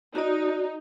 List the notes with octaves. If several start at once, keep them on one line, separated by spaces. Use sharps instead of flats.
D#4 F#4 D5